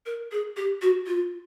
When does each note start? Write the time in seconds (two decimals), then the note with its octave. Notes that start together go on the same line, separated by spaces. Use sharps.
0.06 A#4
0.32 G#4
0.57 G4
0.82 F#4
1.07 F4